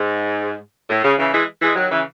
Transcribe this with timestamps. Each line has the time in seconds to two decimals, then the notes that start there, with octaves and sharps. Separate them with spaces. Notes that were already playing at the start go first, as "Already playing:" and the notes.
Already playing: G#2
0.89 A2
1.04 C#3
1.18 C#3 E3
1.33 E3 G#3
1.61 E3 G#3
1.76 D#3 F#3
1.90 C#3 E3